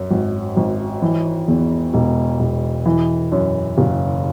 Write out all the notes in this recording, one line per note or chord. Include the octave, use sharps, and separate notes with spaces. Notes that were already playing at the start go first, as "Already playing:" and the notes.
Already playing: F#2
G#1
G#1
E3
E2
E1
E1
E3
F#2
F#1